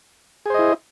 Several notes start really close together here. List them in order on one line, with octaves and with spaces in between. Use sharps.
G#4 C5 D#5 E4